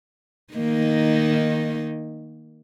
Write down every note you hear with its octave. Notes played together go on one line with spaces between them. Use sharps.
D#3 A#3 D#4